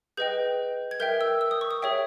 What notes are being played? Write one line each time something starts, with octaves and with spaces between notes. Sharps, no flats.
G#4 B4 D#5 G5 G6
G#6
A#4 E5 G5 G6
E6
E6
D#6
C#6
D#6
G#4 C#5 E5 G5